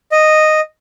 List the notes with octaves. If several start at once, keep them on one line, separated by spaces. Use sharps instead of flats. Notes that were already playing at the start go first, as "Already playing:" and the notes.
D#5